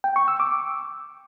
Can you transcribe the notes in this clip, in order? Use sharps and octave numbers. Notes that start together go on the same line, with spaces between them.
G5
C#6
E6
D6